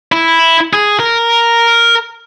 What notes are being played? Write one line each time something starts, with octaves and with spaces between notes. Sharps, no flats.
E4
G#4
A#4